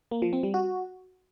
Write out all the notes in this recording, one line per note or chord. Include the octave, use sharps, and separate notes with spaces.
A#3
F3
C4
G3
F#4